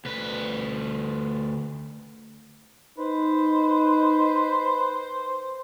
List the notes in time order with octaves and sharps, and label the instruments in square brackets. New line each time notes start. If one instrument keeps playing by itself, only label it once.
[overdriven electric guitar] D2 B4
[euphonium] D#4 [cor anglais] B4 [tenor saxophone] C5